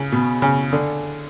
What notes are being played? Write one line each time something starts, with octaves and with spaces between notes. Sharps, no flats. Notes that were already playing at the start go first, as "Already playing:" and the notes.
Already playing: C#3
B2
C#3
D3